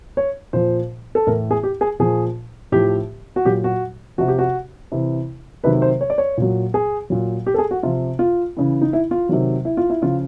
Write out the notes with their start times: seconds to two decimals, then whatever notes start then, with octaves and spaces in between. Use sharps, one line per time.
0.17 C#5
0.53 A#2 F3 C5
1.15 A4
1.27 A2 E3 A#4
1.51 G#4
1.63 G4
1.81 G#4
1.99 A#2 F3 G#4
2.72 A2 F3 G4
3.36 F#4
3.45 A#2 F#3 G4
3.64 F#4
4.18 C3 F3 F#4
4.28 G4
4.39 F#4
4.92 C3 E3
5.64 C3 D#3 F#3 B4
5.82 C5
6.01 C#5
6.10 D5
6.18 C#5
6.37 A#2 F#3
6.74 G#4
7.10 A#2 F#3
7.46 G4
7.54 A4
7.58 G#4
7.71 F#4
7.83 C3 F3 F4
8.19 F4
8.57 C#3 E3
8.81 D#4
8.93 E4
9.11 F4
9.29 C3 D#3 F#3
9.65 E4
9.77 F4
9.90 E4
10.02 C#3 F3 F4